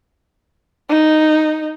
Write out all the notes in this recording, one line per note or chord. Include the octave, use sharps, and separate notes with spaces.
D#4